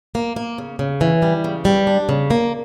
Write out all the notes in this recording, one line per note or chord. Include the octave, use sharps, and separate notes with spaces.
A#3
A#3
C#3
C#3
E3
G3
C#3
G3
D4
C#3
A#3